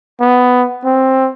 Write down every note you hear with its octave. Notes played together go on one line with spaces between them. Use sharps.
B3
C4